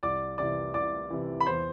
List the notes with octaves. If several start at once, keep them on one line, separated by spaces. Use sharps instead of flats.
C2 D5 D6
C3 E3 D5 D6
C2 D5 D6
C3 E3
B5
E2 C5 C6